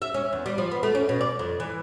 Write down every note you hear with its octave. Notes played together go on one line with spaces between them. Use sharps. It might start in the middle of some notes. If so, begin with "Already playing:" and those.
E5
C#4
E2
G3
F3
B3
A3
C#4
B2
D5
F2
E3